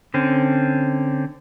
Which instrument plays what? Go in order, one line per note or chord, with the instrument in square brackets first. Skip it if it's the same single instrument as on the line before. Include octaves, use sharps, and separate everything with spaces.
[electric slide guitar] D3 C4 C#4